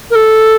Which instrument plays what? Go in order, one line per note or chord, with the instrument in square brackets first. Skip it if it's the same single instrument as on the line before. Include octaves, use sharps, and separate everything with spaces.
[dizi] A#4
A4